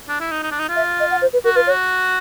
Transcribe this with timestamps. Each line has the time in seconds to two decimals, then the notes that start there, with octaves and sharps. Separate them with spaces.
0.09 D4
0.20 E4
0.31 D#4
0.43 D#4
0.51 D4
0.59 D#4
0.69 F4
0.76 E5
1.00 D#5
1.11 F#5
1.22 C5
1.33 B4
1.44 F#4 A#4
1.55 F4 B4
1.67 C#5
1.70 F#4